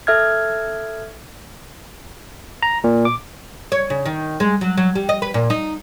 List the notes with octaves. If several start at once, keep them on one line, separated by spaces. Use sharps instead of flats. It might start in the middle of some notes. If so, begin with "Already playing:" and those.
A4 E5 F6 G#6
A#5
A#2
D6
C#5
C#3
D#3
G#3
F#3
F#3
G3
D#5
B4
A#2
D#4